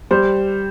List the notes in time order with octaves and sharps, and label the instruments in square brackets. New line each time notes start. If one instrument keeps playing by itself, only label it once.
[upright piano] G3 C5